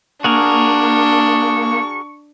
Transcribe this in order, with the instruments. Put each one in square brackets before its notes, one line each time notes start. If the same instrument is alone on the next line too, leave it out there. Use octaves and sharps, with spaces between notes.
[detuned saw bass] A#3 [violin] D4 [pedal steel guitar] F#4 G#4 A#4 [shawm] C#6